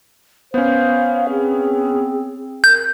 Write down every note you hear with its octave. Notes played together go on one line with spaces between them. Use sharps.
B3 C#4 C5 F5
C4 G#4
A#4 G6